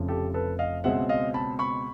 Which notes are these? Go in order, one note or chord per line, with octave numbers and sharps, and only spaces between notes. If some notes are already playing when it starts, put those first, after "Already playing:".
Already playing: F1 F2 C#3 F3
G4 A4
A4 B4
D#5 F5
C#2 B2 G#3 C4 E5 F#5
D#5 F5
A5 B5
B5 C#6